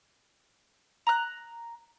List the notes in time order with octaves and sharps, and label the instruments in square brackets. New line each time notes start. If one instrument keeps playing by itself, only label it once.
[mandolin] A#5 F#6